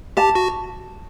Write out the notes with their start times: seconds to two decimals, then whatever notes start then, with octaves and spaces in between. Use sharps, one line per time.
0.17 G4 A5
0.35 F#4